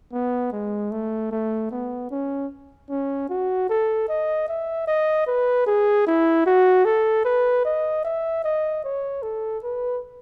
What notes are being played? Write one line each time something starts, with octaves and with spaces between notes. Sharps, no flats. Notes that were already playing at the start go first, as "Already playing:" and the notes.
B3
G#3
A3
A3
B3
C#4
C#4
F#4
A4
D#5
E5
D#5
B4
G#4
E4
F#4
A4
B4
D#5
E5
D#5
C#5
A4
B4